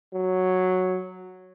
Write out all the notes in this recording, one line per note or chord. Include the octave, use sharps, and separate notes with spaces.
F#3